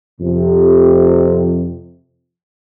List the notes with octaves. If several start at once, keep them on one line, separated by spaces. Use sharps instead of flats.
F2 C3